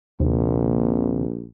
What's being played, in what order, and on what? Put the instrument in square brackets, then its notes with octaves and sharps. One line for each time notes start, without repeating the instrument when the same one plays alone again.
[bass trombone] A#1 [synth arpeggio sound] D#2 C3